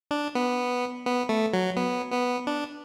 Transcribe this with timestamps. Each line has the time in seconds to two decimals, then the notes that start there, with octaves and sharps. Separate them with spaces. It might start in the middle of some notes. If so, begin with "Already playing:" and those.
0.11 D4
0.35 B3
1.06 B3
1.29 A3
1.53 F#3
1.77 B3
2.12 B3
2.47 D4